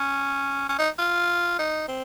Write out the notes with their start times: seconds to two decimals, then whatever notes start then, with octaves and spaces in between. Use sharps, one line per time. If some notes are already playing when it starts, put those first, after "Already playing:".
Already playing: C#4
0.69 C#4
0.79 D#4
0.99 F4
1.59 D#4
1.88 C4